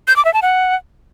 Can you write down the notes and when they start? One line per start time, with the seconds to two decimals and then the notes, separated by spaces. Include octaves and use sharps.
0.08 G6
0.16 D6
0.25 E5
0.34 A5
0.42 F#5